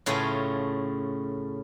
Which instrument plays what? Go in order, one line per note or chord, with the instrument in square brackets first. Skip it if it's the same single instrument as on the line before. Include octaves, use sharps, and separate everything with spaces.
[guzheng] A2 C#3 A3 F4 G#5